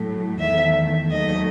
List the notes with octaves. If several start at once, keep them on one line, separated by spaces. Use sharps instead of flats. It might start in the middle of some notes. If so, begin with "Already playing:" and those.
Already playing: A2 F#3 A3
E2 D#3 A3 E5
D#2 D#3 F#3 A3 D#5